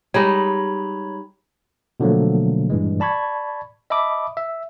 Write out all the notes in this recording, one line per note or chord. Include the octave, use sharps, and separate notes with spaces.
G3 G#3 D#4 C#5 A#5 B5
B2 D3 F3 F#3 A3 A#3
G2 A#2 E3 G#3
D5 A5 B5 C#6 G#6
D#5 E5 A5 B5 D6 D#6
E5